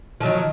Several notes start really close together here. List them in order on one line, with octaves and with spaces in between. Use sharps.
F3 F#3 D#3